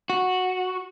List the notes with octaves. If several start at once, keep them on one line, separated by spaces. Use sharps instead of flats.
F#4